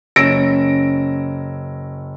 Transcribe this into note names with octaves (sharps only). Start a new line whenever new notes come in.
F#1 C#4 E6 A#6 D7